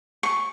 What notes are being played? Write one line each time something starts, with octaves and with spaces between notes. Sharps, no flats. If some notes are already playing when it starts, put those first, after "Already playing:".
C#6